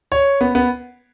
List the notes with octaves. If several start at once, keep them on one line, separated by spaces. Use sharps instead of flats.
C#5
B3
B3